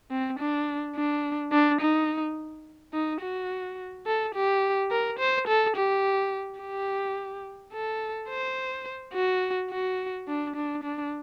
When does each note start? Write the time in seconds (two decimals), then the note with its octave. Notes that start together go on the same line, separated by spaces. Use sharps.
0.11 C4
0.39 D4
0.96 D4
1.52 D4
1.81 D#4
2.93 D#4
3.21 F#4
4.06 A4
4.35 G4
4.91 A#4
5.19 C5
5.47 A4
5.76 G4
6.60 G4
7.73 A4
8.29 C5
9.14 F#4
9.70 F#4
10.28 D4
10.56 D4
10.83 D4